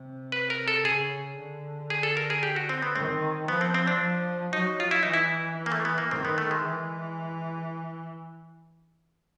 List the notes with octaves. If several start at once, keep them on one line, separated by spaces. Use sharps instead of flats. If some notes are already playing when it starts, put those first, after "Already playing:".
Already playing: C3
B4
A#4
A4
C#3 G#4
D3
G#4
A4
A#4
G#4
G4
F#4
C4
B3
D#3 C4
F3 B3
C4
C4
D4
F3
F#3 D#4
F4
E4
E3 D#4
E4
A#3
A3
B3
A#3
D#3 C4
B3
A3
G#3
E3